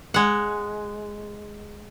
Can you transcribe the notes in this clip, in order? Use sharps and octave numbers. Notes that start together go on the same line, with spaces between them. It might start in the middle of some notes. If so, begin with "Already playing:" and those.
G#3 F#5